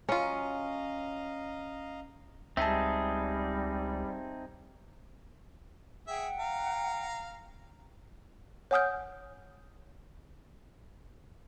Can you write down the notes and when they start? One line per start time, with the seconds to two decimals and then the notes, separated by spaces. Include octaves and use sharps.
0.09 F#3 C#4 F4 D#5 F5 A#5
2.57 C#2 G3 C4 D#4 G#4 E5 A5
6.08 G#4 E5 F#5 G5
6.40 F5 A#5
8.71 C#5 F#5 G#5 D#6 F6 G6